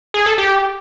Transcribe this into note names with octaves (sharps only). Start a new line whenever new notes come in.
G#4
A4
G4